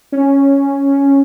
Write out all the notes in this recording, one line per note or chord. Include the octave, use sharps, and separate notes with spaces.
C#4